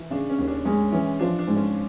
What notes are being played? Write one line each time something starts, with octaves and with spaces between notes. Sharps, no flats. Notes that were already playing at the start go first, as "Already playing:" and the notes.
Already playing: E3
C#3 D4
C#4
D#2
D4
G#3 C#4
E3 C#4
F3 D4
D4
G#2
C#4